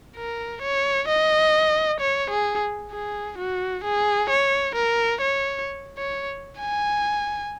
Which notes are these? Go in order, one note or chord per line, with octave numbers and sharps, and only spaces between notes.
A#4
C#5
D#5
C#5
G#4
G#4
F#4
G#4
C#5
A#4
C#5
C#5
G#5